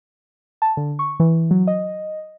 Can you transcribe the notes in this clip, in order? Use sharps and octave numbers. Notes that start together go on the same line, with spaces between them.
A5
D3
C#6
E3
F#3
D#5